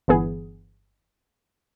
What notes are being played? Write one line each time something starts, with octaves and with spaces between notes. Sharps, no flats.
G1 E3 B3 G#4